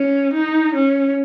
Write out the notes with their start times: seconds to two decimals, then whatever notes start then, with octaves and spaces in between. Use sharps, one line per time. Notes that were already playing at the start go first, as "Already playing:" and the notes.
Already playing: C#4
0.34 D#4
0.75 C#4